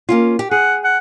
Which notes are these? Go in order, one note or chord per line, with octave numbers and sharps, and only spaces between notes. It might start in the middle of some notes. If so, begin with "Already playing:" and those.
A#3 C#4 F4
G4
G#4 F#5
F#5